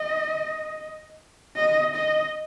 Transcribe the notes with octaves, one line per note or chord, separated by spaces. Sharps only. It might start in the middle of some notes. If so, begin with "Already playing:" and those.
Already playing: D#5
D#5
D#5